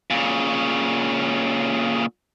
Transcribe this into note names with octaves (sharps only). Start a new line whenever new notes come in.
A#2 C#3